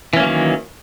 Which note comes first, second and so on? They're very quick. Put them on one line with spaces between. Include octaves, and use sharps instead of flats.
E3 C#4 A#3 F#3 D#3